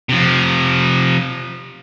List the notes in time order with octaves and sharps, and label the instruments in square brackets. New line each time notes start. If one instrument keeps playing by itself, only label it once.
[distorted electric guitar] C3 F3